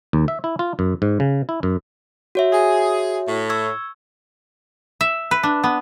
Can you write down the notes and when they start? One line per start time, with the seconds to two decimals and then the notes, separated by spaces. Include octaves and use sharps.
0.13 D#2
0.28 E5
0.44 E4
0.59 F4
0.79 F#2
1.02 G#2
1.20 C#3
1.49 E4
1.63 F#2
2.35 F#4 C#5 E5
2.53 G#4
3.28 A2
3.50 C#6 E6 G#6
5.01 E5
5.31 B4
5.43 D4
5.64 B3